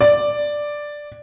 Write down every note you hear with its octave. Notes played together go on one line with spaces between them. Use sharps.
D5